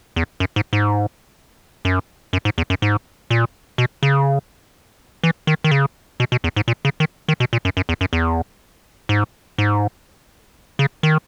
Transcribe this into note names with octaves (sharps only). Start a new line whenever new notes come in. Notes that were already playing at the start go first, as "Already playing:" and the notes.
E2
F#2
G#2
G#2
F#2
F#2
G#2
E2
F#2
G#2
A#2
B2
C#3
E3
D#3
D#3
C#3
B2
B2
E2
G#2
A#2
C#3
D#3
D#3
B2
A#2
F#2
F#2
E2
F#2
E2
G#2
G#2
C#3
D#3